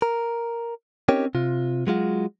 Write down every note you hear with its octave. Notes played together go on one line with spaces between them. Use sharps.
A#4
C4 C#4 D#4 G4 A#4 C#5
C3 F4
F#3 G#3 F4 F#4